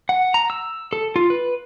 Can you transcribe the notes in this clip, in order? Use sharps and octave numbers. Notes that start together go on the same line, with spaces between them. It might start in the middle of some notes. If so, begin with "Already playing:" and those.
F#5
A#5
E6
A4
F4
B4